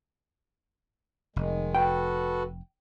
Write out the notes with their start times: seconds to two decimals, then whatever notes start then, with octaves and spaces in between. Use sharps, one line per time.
1.36 F1 D#3 G#3
1.75 F#4 A4 B4 G5